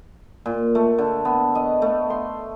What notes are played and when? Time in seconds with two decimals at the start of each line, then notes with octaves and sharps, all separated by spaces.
0.46 A#2
0.75 A3
0.98 D3
1.25 B3
1.55 D#5
1.82 A3
2.10 C6